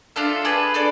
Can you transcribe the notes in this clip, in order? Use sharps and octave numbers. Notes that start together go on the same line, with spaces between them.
D4 F4 A4 E5
D4 G#4 B4
D4 A4 D5